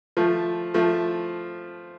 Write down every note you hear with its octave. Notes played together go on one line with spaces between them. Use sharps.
F3 A3
F3 A3